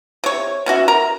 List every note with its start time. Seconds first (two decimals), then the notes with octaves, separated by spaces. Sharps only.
0.24 C3 C#5
0.66 B2 C#4 F#4 E5
0.88 A#4 A#5